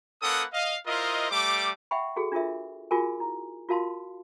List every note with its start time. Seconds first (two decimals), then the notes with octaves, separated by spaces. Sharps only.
0.22 A#3 C#4 A4 B4 F#5 D#6
0.53 D#5 F5
0.86 E4 F4 A#4 C5 D#5
1.31 G3 A3 D6
1.91 E5 F#5 G5 B5 C#6
2.16 F#4 G#4 A4
2.32 D4 F4 G#4 A#4 E5
2.91 F4 F#4 G#4 A#4 G#5
3.20 E4
3.69 F4 F#4 A#4 F5 A5 C6